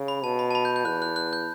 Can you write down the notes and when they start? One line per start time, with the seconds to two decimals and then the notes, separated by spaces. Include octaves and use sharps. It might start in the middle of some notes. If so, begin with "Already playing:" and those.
Already playing: C#3
0.08 B5
0.24 B2 A5
0.39 B5
0.51 A5
0.55 B5
0.65 G6
0.76 G6
0.85 E2 F#6
1.02 F#6
1.16 F#6
1.33 G6